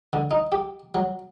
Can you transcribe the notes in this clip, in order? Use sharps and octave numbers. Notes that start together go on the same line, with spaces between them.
D3
D#4
G4
F#3